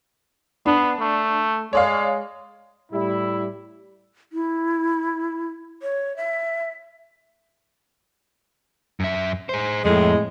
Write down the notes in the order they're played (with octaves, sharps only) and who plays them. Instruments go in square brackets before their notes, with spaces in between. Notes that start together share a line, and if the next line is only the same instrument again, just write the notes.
[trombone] B3 [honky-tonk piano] D4
[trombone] A3
[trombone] G#3 [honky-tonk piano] C#5 D5 F5
[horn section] A2 G3 E4
[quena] E4
C#5
E5
[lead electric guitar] F#2 E5
G#4 C5
[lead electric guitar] F2 [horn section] A2 G#3